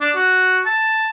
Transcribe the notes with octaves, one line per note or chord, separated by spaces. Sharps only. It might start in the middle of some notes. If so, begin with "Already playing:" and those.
D4
F#4
A5